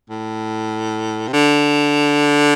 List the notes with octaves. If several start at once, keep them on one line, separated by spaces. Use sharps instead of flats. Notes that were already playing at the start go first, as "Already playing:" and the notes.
A2
C3
D3